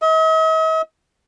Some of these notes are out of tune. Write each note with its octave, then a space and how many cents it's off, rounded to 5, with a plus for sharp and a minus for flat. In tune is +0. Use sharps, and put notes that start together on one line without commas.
D#5 +45